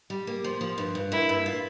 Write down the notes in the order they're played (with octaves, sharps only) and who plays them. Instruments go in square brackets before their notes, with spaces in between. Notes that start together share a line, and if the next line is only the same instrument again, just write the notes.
[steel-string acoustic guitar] G3
A#3
F3
F3
G2
G2
[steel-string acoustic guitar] A#3 [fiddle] E4
[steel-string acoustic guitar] G2
F4